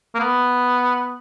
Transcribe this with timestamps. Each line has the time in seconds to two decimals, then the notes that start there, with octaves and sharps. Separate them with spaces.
0.15 A#3
0.20 B3